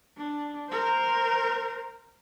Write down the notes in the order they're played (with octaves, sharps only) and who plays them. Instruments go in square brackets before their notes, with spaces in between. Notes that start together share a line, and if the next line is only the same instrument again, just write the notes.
[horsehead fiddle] D4
A#4 C5